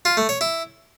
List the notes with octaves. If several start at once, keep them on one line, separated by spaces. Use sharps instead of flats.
F4
A3
C#5
E4